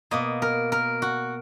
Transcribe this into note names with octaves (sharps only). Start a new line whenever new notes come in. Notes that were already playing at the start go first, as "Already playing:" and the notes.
B2 A#3 D#5
A#4
A#4
F#4